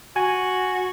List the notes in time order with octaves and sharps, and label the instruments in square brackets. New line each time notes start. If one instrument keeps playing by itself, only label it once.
[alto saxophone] F#4 [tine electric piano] G#5